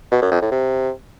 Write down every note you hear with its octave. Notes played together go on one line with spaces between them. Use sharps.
B2
F#2
F2
A2
C3